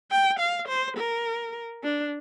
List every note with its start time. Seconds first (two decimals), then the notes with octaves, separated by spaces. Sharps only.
0.11 G5
0.40 F5
0.68 C5
0.97 A#4
1.84 D4